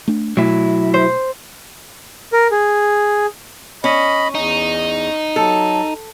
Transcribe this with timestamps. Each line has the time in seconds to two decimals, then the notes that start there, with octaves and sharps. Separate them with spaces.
0.08 A3 D4
0.37 B2 F#3 A3 E4
0.94 C5
2.32 A#4
2.51 G#4
3.84 C#4 D#5 B5
4.35 E2 D#4
5.36 F#3 A4